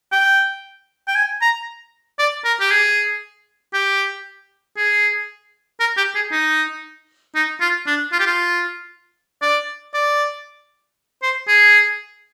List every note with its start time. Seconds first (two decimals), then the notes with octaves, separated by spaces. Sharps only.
0.12 G5
1.08 G5
1.15 G#5
1.41 A#5
2.19 D5
2.45 A#4
2.61 G4
2.71 G#4
3.74 G4
4.77 G#4
5.80 A#4
5.97 G4
6.15 G#4
6.32 D#4
7.35 D#4
7.61 F4
7.87 D4
8.13 F4
8.19 G4
8.26 F4
9.42 D5
9.94 D5
11.22 C5
11.48 G#4